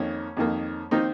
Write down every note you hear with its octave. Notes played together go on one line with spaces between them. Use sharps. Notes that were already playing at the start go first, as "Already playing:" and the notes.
Already playing: F2 D#3 A#3 C#4
F2 D#3 A#3
D#3 A#3 C4 D#4